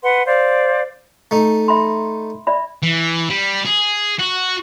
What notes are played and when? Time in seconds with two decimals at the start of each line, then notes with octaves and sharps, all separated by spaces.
0.03 B4 F#5 C6
0.27 C5 D5 F5
1.31 A3 D#4
1.68 E5 B5 C6
2.47 D5 E5 B5
2.83 E3
3.30 G3
3.65 G#4
4.19 F#4